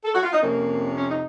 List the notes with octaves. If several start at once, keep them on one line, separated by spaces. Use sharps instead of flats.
A4
F#4
F4
D#4
F2 C3 F3 A#3 C#4
C#4
D#4